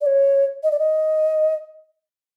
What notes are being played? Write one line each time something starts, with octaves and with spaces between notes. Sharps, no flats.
D5
C#5
D#5
D5
D#5